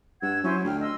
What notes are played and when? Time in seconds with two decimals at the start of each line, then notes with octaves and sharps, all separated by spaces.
0.22 G2 F#5 E6 G#6
0.44 F#3 C#4 E4 C5
0.65 D2 G5 F6
0.81 D#5 C6 E6